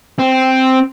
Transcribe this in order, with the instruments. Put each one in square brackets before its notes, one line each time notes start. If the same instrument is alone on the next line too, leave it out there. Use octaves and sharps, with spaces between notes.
[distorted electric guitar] C4